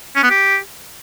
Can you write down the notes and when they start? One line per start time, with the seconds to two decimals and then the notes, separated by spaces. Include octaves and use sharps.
0.16 C#4
0.23 B3
0.30 G4